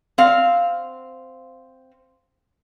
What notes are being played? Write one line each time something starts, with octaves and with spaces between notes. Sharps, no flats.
C4 F5